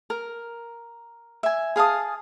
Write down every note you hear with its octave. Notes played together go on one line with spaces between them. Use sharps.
A#4
E5 G#5
G#4 F5 A5 D#6